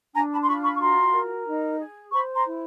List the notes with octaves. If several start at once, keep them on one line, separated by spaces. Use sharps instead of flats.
D4 G#5 A#5
A5 B5
C6
F4 B5 C#6
B5 C#6
C#6
F#4 A#5 C6
A#4
D#4
G#4
C5 B5 C#6
A#5 C6
E4